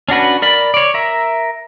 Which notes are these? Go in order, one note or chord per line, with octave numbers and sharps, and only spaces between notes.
C#4 D4 F#4 B4
A#4 D5 B5
C#5 D5
A#4 E5